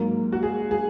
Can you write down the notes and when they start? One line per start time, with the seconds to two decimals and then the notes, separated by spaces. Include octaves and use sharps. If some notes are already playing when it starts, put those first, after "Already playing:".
Already playing: G#2 F#3 A#3
0.32 F#4
0.43 G#4
0.71 G#4